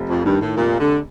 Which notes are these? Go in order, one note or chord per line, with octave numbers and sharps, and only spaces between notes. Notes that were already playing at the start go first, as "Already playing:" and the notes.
Already playing: F1 F3
F2
G2 D#3
A2
F1 A#2
D3